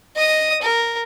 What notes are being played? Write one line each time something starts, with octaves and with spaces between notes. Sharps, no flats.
D#5 D#6
A#4